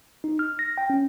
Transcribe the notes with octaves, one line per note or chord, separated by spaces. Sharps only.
D#4
F6
A#6
G5
C#4